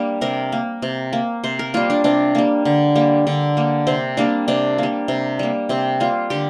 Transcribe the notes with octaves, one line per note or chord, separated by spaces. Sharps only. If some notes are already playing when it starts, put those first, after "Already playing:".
Already playing: G3 A#3 D4
C3 A#4
A#3
C3
A#3
C3 C5
A#4
G3 A#3 F4
D4
C3 D4
G3 A#3
D3
G3 A#3
D3
G3 A#3
C3 C4
G3 A#3 D4
C3 D4
G3 A#3
C3
G3 A#3
C3 C4
G3 A#3 F4
D3 G4